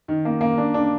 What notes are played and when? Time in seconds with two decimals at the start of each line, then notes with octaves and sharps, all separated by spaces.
0.08 D#3
0.25 A#3
0.41 A#3
0.58 D4
0.74 D4